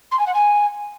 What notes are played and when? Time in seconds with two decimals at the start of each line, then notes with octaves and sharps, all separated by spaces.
0.11 C6
0.19 G#5
0.26 F#5
0.34 G#5